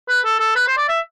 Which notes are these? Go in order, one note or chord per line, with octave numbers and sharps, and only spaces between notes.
B4
A4
A4
B4
C5
D5
E5